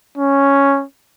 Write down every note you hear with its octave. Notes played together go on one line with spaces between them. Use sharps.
C#4